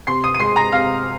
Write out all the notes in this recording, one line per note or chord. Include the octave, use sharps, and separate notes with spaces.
C3 C6 C7
D#6 D#7
D#7
G#3 C6 C7
A#5 A#6
C3 F5 F6